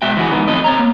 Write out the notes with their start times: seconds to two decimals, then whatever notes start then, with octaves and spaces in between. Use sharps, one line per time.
0.02 B2 G#3 F#4 E5 G5
0.17 E3 F#4 G#4
0.31 F2 G#2 D#3 B3
0.48 F2 F#3 A3 C4 D#5
0.64 C4 C#5 A#5
0.79 A#3